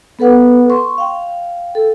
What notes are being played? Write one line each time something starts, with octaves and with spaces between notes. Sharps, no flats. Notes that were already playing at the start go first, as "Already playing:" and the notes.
B3 A4 B4 F#5
C6 C#6
F5 G5
A4